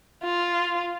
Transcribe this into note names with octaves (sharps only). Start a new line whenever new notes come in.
F4